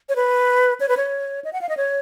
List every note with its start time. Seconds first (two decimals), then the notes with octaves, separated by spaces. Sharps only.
0.09 C#5
0.16 B4
0.80 C#5
0.89 B4
0.97 C#5
1.45 D#5
1.53 F#5
1.61 F5
1.69 D#5
1.77 C#5